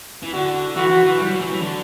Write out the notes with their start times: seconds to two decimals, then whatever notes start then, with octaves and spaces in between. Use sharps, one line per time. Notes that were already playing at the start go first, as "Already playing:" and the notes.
0.23 E3
0.33 D3 F#4
0.76 E3 F#4
0.90 E3
1.05 E3
1.19 G3
1.29 F#3
1.40 E3
1.46 F#3
1.51 E3
1.61 D3